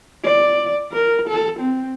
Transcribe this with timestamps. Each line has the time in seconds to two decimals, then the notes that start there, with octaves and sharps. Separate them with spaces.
0.25 D5
0.92 A#4
1.28 A4
1.60 C4